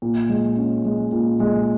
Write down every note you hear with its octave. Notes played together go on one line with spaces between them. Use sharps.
A#2
G#3
C#4
G#3
A#2
G#3